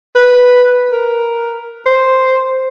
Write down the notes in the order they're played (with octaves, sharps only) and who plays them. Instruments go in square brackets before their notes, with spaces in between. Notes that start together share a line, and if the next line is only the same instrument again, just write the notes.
[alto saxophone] B4
A#4
C5